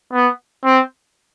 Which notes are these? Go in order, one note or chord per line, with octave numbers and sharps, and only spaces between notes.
B3
C4